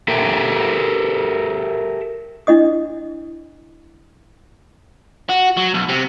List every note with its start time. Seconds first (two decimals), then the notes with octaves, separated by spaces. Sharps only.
0.08 G4 A4 A#4 E5 G5
2.47 D4 E4 D#5 D#6
5.29 F#4
5.57 F#3
5.74 B1
5.89 C3